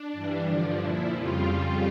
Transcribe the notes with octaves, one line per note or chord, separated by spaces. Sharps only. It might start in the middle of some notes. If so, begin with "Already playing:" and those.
Already playing: D4
G2 E3 G3
G2 D3 F3
A#2 F3 E4
F2 C#3 G3 F4
F2 C#3 G3 F4